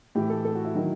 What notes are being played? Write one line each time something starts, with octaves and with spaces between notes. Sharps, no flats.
A2 E3 G4
A4
A4
F#4
E4
D#3 F#3